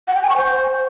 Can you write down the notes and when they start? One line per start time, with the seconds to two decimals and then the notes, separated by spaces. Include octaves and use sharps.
0.08 F#5
0.15 G5
0.22 G#5
0.30 C#6
0.37 C5